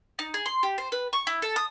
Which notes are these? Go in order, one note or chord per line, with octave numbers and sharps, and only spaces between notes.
D#4
G#4
C6
G4
C5
B4
C#6
E4
A4
D#6